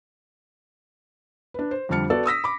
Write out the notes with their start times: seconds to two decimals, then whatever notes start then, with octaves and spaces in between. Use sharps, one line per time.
1.54 D4 B4
1.71 C5
1.89 F2 D3 G3 A5 F6 C#7
2.10 B3 F#4 A4 D5
2.25 D#6 E6 A#6 B6
2.44 B5 D6